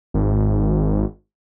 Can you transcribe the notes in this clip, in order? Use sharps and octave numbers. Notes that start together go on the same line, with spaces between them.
G#1